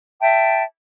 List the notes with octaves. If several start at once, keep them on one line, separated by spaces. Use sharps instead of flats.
E5 G5 A5